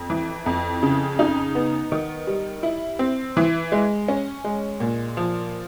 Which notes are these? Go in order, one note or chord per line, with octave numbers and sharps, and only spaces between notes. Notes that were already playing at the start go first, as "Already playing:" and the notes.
Already playing: F2
E3
F2
C#3
D#4
B3
D#3
G3
E4
C4
E3
G#3
C#4
G#3
A#2
F3